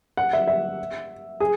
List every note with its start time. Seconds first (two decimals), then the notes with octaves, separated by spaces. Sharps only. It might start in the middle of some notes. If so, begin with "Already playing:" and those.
0.17 F#5
0.33 E5
0.47 E5
1.40 G#4